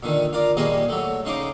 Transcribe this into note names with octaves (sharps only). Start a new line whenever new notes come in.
A#2 D3 D#3
F4 A#4 D5
A#1 D#2 G3 A#3 G#4 D#5
F#3 A3
C#3 D#4 C5 D6